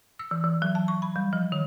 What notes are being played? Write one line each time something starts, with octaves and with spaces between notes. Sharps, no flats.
E6
E3
E3
F#3
A5
C#6
B5
G3
F3
D#3